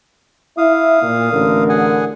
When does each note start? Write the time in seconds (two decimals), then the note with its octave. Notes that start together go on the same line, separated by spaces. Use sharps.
0.58 E4 E5 F5 D#6
1.02 A#2
1.32 A1 D3 A#4
1.69 G#4 F#5 G#5